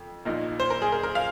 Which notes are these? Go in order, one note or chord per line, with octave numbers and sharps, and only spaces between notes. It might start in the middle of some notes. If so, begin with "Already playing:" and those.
Already playing: F2
A#1 A#2 A#3 D#4
C5
A#4
G#4
A#4
A#4
F5